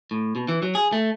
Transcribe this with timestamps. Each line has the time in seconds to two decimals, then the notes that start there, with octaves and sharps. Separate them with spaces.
0.11 A2
0.36 B2
0.48 E3
0.62 F#3
0.75 G#4
0.93 A3